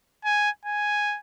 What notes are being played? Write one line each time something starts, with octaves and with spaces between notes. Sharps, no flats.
G#5
G#5